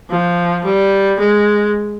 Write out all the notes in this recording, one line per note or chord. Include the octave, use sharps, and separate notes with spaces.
F3
G3
G#3